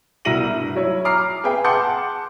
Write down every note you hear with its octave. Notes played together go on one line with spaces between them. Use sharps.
C2 B2 E4 A#6 D#7 F#7
G2
F#3 E4 C#5
A#5 D6 F6 C7
G#4 B4 E5 G5
F#5 A5 C6 D6 G6 C#7